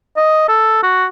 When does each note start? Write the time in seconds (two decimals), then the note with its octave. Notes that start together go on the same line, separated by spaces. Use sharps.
0.16 D#5
0.48 A4
0.83 F#4